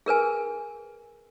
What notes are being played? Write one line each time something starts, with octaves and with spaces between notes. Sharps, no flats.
G#4 A#4 B4 G#5